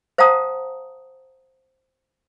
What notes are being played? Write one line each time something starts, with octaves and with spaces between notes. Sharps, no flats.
C5 F5 F#5 A5 A#5 D#6